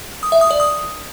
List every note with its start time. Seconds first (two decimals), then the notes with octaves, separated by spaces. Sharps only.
0.23 D#6
0.32 E5
0.41 D#6
0.51 D5
0.60 D#6